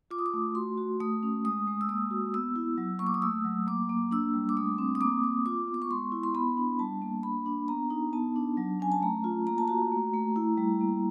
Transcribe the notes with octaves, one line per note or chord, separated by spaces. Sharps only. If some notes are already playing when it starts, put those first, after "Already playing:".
F4 D6
D#6
D6
A3
F#4 C6
F#4
A3 D#6
C#4
G#3 D#6
G#3
E6
A#3 D#6
F#4
B3 E6
E4
F#3
A#3 C#6
D6
D#6
A3 E6
F#3
A#3 D6
A#3
D4 E6
G3
D6
A3 D#6
C4
D#6
A#3 D6
A#3 D6
F4 D6
B3
D6
C#6
G#3 C6
E4
C6
B3 B5
D4
G3 A5
A#3
D4 B5
D4
B3 A#5
D#4
B3 A5
D4
F#3
C#4 G#5
A5
A3 A#5
F4
A#3 A#5
A5
F#4 A#5
A3
A3
E4
G3
A#3